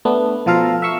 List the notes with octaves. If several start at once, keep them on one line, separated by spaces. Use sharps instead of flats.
A3 B3 D4
B2 F3 F4 A4 F5 A#5
E5 F5 C#6 E6